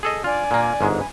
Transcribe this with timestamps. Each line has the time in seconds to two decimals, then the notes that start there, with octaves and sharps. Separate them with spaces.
0.03 G#4 A4 D#5
0.24 D4 F4 D5 G#5
0.51 A#2 A#3
0.81 G1 G#2 G#3
0.97 B4 G#5